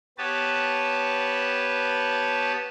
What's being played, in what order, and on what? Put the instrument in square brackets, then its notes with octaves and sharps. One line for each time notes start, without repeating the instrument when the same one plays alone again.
[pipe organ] B3 G4 B4 C#5 A5